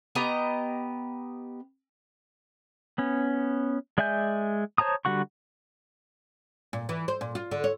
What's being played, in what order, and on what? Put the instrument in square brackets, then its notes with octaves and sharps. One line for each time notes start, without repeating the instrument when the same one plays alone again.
[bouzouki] B3 G4 D#5 A#5
[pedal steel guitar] B3 C#4
G#3 D5 E5 G#5 G6
C5 C#5 A5 A#5 D#6
D3 G3 F#4 F#5 C#6
[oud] A#2
E3
C5
A#2
F4
D3
C#5